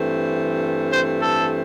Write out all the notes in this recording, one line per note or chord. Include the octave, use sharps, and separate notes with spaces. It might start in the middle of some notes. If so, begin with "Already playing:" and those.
Already playing: G2 E3 A3 C4
C5
A4